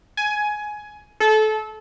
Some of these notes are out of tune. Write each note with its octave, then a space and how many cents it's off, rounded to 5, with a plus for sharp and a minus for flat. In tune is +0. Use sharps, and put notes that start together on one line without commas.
G#5 +15
A4 -25